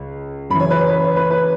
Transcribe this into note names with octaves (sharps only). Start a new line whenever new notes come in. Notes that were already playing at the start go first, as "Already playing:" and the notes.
Already playing: C#2
F#2 C#3 E3 B5
C#5
B4
C#5
B4
C#5
B4
B4